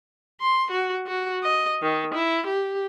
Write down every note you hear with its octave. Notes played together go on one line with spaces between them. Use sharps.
C6
F#4
F#4
D#5
D#3
E4
G4